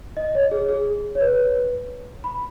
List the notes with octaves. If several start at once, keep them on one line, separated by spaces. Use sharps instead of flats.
D#5
C#5
G#4
G#4
C#5
B4
B5